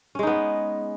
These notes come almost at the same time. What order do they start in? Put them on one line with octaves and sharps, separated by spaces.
C#4 G#3 D#4 B3